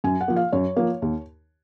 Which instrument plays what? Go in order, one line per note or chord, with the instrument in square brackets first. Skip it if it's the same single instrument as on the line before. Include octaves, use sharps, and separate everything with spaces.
[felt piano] F#2 G#5
F#5
F3 A#3
F5
F#2 C#5
F3 A#3
D#2